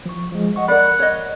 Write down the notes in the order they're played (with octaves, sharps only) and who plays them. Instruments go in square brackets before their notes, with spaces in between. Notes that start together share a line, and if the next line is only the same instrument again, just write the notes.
[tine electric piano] F3 C#6
F3 G#3
D#5 F#5 C#6
[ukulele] A#4 D5 [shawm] F#5 [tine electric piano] B5
[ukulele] C#5 D#5